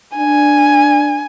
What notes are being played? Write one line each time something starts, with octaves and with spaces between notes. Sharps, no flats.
D4 G#5